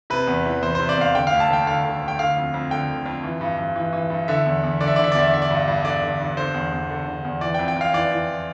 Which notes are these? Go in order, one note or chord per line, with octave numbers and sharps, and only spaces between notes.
C3 B4
E2
E3
E2 C5
C5
C3
D5
E2 F5
D3 G5
F5
D2
A5
D2 G5
D3 F5
D3
D2
G5
D3 F5
F2
F2
D3 G5
D3
F2
E3
G2
G2
E3
E3
G2
D3 E5
E2
E2
D3 D5
E5
D3 D5
E5
D5
E2 E5
D5
D3 E5
D5
G2
G2
D3 D5
D3
G2
D3 C5
E2
E2
D3
D3
E2
E3 D5
G5
F2
G5
F2 F5
E3 D5
E3